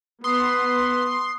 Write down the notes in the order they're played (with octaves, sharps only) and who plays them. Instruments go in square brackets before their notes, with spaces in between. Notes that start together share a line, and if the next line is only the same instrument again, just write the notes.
[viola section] B3 [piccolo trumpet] B4 [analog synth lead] C6 [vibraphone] D#6